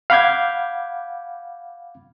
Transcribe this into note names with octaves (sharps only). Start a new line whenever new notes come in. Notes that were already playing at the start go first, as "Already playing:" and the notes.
F5 F#5 B5 D6 G6 G#6